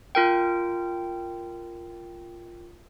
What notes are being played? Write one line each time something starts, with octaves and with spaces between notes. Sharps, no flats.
F4 A#4 G5